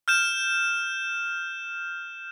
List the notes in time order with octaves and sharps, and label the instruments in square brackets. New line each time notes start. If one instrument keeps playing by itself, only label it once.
[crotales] F6 G6 E7